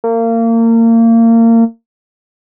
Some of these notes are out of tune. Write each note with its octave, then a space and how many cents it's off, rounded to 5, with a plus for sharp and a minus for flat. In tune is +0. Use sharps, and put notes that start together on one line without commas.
A#3 -30